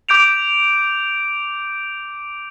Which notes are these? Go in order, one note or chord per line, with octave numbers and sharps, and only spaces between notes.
D6 G6 D7 F7